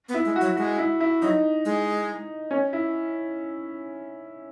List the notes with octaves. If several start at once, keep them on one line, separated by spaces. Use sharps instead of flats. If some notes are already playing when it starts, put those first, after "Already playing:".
B3
E4
G#3
F#4
F#3
G#3 F#4
E4
E4
F#3 D#4
G#3
C#4
E4